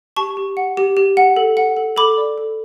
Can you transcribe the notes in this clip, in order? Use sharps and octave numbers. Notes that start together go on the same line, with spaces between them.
G4 A5 C#6
G4
F#5
G4
G4
F#5
A4
F#5
A4
A4 B5 D6
D5
A4